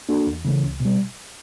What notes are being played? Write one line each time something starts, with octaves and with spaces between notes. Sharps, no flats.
A#3 D4 F#4 A4
E2
C#3 E3 A3 C#4
C#2
B2 G3